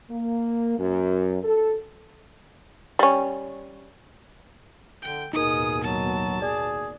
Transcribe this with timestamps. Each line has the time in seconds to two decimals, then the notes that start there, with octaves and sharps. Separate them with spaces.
0.10 A#3
0.78 F#2
1.43 A4
2.99 G3 C#4
5.02 D3 G5
5.33 A1 D#2 B2 D#4 G#4 A#4 D#6
5.83 F#3 A5
6.42 G#4 D5